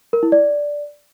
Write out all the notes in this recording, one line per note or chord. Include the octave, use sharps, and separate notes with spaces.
A#4
E4
D5